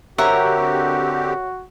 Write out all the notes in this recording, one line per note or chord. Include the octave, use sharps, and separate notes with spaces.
D3 C4 F#4 G4 A#4 C#5 E5 F#5